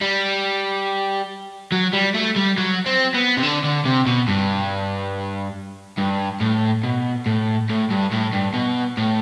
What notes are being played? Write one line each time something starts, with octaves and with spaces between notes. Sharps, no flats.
G3
F#3
G3
A3
G3
F#3
C4
B3
C3
D3
D3
C3
B2
G2
G2
A2
B2
A2
A2
G2
A2
G2
B2
A2